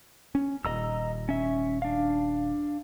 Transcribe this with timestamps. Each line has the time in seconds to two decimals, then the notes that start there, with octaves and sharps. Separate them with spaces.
0.35 C#4
0.65 D#1 D#5 A#5 E6
1.29 C#4 E5
1.82 D4 F5